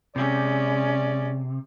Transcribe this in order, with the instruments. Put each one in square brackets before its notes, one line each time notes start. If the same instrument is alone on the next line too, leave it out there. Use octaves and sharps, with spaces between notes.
[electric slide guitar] C3 [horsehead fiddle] G#3 C#4 [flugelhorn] D5